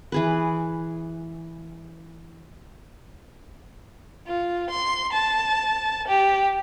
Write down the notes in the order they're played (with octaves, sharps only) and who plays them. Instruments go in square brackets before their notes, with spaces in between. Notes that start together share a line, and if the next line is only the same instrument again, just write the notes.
[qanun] E3 G#4 B4
[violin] F4
C6
A5
G4